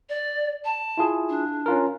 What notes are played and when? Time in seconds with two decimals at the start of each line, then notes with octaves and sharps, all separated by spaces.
0.09 D5
0.65 A5
0.97 E4 F4 G#4
1.29 D4
1.66 C#4 F4 A#4